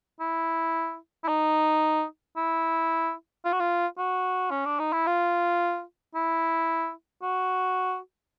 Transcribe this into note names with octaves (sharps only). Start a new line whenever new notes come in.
E4
E4
D#4
E4
F4
F#4
F4
F#4
C#4
D4
D#4
E4
F4
E4
F#4